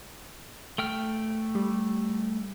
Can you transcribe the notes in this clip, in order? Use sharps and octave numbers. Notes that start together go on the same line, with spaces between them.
A3 G5 F6
G3